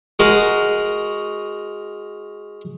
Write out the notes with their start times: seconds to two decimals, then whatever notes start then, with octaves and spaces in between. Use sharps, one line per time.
0.19 G#3 F#4 A#4 D#6